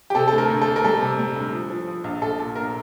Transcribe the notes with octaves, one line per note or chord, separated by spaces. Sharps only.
G4
C3 A4
D2 A4
A#4
D2
A4
D2
A#4
G3 A4
C3
G3
D2
F3
F3
F3
A#1
A#1 A4
A#2
A#1 A#4